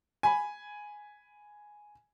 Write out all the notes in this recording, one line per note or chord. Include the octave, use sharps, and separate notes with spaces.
G#5 B5